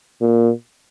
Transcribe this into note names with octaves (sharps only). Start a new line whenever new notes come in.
A#2